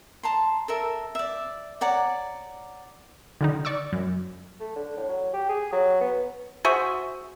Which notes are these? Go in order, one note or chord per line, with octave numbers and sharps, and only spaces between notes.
A5 A#5 C6
A4 A#4 E5
D5 E5
C#5 D5 F#5 A#5
D3 D#3 D#4
D5 C#6 D6 E6
F#2
A3
D3
A2
F#3
G4
G#4
F#3
B3
F#4 G#4 C5 E5